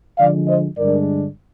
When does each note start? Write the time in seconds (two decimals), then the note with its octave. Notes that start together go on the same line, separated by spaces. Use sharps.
0.18 D3 F3 G#3 D5 F5
0.48 C5 D#5
0.77 G2 D3 G#3 D4 A#4 D5